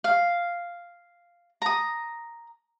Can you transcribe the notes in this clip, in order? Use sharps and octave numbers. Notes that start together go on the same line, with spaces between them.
F5
A#5 D#6